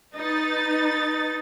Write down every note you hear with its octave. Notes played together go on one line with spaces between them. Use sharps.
D#4 B4 A6